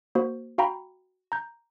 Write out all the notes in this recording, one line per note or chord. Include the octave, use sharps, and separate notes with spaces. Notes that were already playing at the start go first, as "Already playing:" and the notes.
A#3 F#4 C5
F#4 F5 G5 A#5 B5
A#5 G6